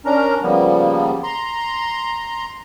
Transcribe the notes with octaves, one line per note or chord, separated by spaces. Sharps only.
C#4 D4 A#4 A#5
C#3 F3 G3 A#3 B3
A#5 C6